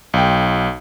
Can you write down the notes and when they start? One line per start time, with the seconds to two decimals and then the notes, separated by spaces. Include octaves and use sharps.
0.14 B1 G5